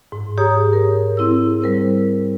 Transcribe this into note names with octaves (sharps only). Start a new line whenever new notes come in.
G#2
G4 G#4 C#5 A#5 D#6
A#4
C4 E4 G#4 E6
G3 A#4 C5